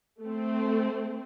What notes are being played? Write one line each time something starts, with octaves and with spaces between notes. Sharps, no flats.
A3 C4